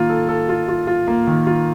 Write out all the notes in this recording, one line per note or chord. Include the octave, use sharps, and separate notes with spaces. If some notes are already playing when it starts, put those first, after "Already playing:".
Already playing: D#3 A#3 F4
A4
A4
F4
F4
F4
A#3
D#3
F4